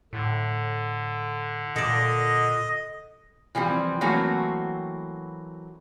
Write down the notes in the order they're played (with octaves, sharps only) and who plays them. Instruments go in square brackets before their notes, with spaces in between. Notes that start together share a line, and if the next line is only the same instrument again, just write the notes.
[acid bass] A2 [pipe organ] D3
[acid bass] A#2 [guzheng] A4 D5 [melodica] D#5
[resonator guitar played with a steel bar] E3 F3 G3 C4
E3 F#3 A3 A#3 C4 F#4